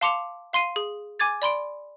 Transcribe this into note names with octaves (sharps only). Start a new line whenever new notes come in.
F5 A5 C6 D6 C#7 F7
F5 C6 C7 D#7
G#4
G#5 D6 G#6 A6
D5 B5 C6 D7